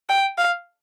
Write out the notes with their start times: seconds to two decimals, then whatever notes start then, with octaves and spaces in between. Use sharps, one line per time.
0.09 G5
0.38 F5